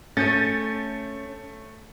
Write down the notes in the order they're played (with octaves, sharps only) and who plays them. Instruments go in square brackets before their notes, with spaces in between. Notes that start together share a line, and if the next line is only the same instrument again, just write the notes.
[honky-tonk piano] A3 G6 A6 [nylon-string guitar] C#4